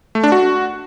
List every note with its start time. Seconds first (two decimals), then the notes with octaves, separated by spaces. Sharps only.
0.15 A3
0.24 D4
0.32 F#4